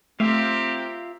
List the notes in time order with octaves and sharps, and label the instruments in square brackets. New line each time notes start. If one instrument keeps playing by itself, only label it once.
[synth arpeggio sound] A3 [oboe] C4 [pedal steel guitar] F4 E5 F5 [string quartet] G4 A#4